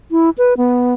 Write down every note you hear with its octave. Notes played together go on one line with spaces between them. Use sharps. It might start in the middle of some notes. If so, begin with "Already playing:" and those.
E4
B4
B3